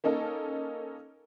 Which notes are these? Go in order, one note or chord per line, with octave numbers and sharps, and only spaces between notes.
A#3 C#4 D#4 A4 A#4